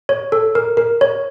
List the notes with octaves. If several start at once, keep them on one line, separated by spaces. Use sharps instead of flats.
C#5
A4
A#4
A#4
C#5